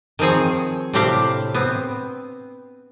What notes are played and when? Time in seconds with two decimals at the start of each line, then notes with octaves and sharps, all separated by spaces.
0.19 D#3 F3 C4 G#4 C#5
0.93 A2 C3 C4 D4 G4 F5
1.55 B3 C4